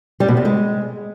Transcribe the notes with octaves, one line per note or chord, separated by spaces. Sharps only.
G3
B2
C3
G#3